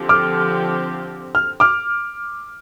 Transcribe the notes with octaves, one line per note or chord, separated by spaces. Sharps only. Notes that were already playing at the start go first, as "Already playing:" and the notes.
Already playing: D3 F3 C4 G4
D6 F6
F6
D6 F6